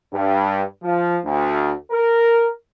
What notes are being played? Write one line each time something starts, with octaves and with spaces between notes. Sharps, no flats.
G2
F3
D2
A#4